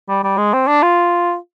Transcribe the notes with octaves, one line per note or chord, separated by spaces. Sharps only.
G3
G3
G#3
C4
D4
F4